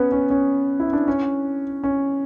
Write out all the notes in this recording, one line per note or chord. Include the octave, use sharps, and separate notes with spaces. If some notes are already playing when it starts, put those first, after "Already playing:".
Already playing: B3 C#4
C#4
C#4
E4
D4
C#4
C#4